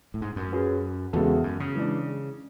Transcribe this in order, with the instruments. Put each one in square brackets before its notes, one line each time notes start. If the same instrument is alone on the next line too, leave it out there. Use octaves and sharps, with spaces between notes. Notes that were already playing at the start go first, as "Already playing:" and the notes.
[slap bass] A2
G#2
F#2
[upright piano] F#3 C#4 G#4 B4
[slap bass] E2 [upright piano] C#3 G#3 B3 F#4 A4
[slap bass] F#2
C#3
[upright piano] E3 G#3 D4